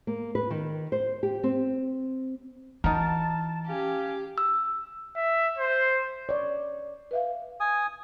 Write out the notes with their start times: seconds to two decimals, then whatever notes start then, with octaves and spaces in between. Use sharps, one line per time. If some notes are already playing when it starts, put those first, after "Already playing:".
0.07 A#3
0.35 B4
0.51 D#3
0.92 C5
1.23 G4
1.43 C4
2.84 E3 D#4 F#4 A#4 A5
3.67 C#4 G4 F5 G#5
4.38 E6
5.16 E5
5.58 C5
6.29 C#5 D5
7.11 B4 E5 F5
7.60 G#5 D#6